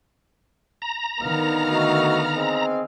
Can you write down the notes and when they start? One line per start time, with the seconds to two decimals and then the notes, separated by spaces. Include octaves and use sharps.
0.82 A#5
1.22 D3 D#3 B3 F5
1.70 A3 F#4 D#5
2.35 C4 G#4 D#5